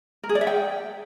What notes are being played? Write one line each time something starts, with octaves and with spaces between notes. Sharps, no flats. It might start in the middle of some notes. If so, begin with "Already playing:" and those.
A#4
G#4
D5
E5
G5